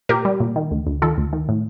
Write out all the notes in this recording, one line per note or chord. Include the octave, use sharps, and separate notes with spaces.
A#2 G4 A#4
G3
A#2
D#3
D2
D2
D#3 F4 A4
D2
D#3
A2